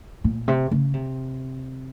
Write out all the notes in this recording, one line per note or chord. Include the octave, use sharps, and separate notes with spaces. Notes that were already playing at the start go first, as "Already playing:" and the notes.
A#2
C3
C#3
C3